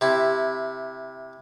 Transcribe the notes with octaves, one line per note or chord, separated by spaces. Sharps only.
C3 E4